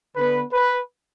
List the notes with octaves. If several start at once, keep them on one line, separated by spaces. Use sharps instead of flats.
D3 B3 D4 B4
B4